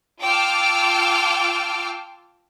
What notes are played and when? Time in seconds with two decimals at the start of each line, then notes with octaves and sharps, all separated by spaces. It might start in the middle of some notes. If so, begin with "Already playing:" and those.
0.20 F4 G5 A5 D6 E6 F6